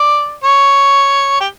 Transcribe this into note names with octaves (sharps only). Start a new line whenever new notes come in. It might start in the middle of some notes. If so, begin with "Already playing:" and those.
Already playing: D5
C#5
G4